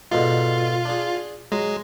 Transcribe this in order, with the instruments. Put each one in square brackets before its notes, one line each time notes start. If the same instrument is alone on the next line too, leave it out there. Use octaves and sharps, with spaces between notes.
[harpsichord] G#2 B2 D3 [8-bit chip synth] F4
[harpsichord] D4 G#4
[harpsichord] F#3 [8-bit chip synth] G#3